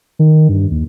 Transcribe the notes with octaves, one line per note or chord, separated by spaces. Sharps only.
D#3
G2
D#2